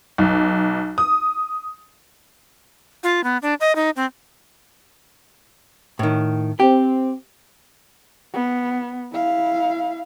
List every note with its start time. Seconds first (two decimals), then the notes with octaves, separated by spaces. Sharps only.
0.18 B1
0.98 D#6
3.03 F4
3.24 B3
3.42 D4
3.60 D#5
3.75 D#4
3.96 C4
5.99 A2 D#3
6.60 C4 G4
8.33 B3
9.12 E4 F5